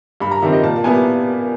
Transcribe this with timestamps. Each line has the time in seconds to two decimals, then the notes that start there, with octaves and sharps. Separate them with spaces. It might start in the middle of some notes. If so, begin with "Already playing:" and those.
0.20 G2 B5
0.31 A#5
0.42 D#3 G3 C4 E5
0.52 D#5
0.63 A#2 A5
0.76 A5
0.84 G3 B3 E4 G#5